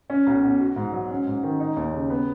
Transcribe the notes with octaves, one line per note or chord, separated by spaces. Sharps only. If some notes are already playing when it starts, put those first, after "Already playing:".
C#4
B1
B2
F#4
G#2
F#3
C#4
G#2
D#3
D#4
D#2
C#3
B3